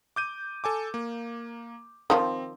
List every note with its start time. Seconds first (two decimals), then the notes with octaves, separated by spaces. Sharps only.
0.16 D6 G6 D#7
0.64 A4 G#5 D6
0.94 A#3
2.10 D#3 F3 C4